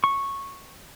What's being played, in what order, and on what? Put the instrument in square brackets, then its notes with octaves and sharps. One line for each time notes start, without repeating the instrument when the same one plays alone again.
[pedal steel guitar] C#6